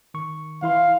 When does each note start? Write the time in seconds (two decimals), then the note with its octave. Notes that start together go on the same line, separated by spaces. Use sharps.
0.14 D#3 C#6
0.62 E3 E4 F5 C6